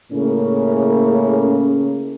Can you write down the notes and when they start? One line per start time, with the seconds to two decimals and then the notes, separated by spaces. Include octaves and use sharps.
0.12 A2 C#3 A#3 C#4